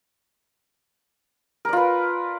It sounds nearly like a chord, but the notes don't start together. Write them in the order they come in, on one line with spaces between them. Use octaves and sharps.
A#4 D5 F4 B4